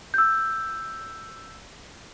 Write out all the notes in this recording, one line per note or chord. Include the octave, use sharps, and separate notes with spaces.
E6 G6